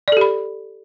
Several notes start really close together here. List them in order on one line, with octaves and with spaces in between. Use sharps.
D5 A4 G4 B5